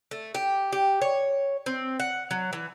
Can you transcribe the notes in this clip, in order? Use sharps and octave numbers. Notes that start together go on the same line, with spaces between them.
A3
G4
G4
C#5
C4
F#5
F#3
E3